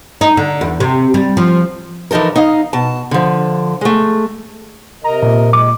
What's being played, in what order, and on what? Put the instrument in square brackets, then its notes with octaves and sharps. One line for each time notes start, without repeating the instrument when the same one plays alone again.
[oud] D#4
D3
E2
C3
G3
F3
[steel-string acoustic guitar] E3 F3 D#4 A4 A#4
D#4 D#5 F5
B2 A5
D3 F3
G#3 A3
[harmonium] C3 A#4 D#5 [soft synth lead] A#5
[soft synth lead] A#2
[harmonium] G#3 [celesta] D6